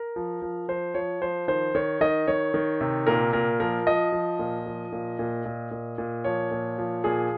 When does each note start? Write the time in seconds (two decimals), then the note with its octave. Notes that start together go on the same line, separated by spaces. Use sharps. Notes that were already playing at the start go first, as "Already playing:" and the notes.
Already playing: A#4
0.16 F3
0.42 F3
0.68 F3 C5
0.94 F3 C#5
1.21 F3 C5
1.48 D#3 C5
1.75 D#3 C#5
2.01 D#3 D#5
2.27 D#3 C#5
2.54 D#3
2.81 C3
3.07 A#2 A#4
3.33 A#2 A#4
3.60 F3 A#4
3.87 F3 D#5
4.12 F3
4.39 A#2
4.66 F3
4.92 A#2
5.19 A#2
5.45 A#2
5.71 A#2
5.98 A#2
6.24 F3 C#5
6.51 A#2
6.78 F3
7.04 A#2 G#4